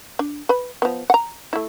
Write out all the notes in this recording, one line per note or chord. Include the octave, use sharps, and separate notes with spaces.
D4
B4 B5
F3 B3
F#5 A#5
A3 E4